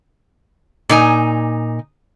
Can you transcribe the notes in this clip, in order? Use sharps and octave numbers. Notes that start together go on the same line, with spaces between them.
A#2 D#4 G#5